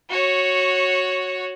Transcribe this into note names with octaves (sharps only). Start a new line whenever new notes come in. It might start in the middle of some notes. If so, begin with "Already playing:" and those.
F#4 C#5